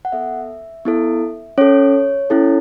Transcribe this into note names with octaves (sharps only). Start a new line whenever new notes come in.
F#5
B3 A4 E5
B3 E4 A4
C#4 A4 C#5
C#4 E4 A4